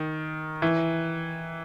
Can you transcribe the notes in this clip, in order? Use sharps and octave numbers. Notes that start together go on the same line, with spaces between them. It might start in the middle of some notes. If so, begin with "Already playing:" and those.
Already playing: D#3
E3